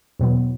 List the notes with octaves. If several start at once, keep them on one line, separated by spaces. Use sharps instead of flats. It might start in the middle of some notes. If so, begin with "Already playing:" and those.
E2 B2 F#3 B3